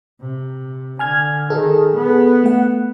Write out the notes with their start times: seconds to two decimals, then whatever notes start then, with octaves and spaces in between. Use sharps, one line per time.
0.20 C3
0.99 D3 G#5 F6 G#6
1.50 D#3 G#4 A4
1.95 B3
2.44 A3 F#5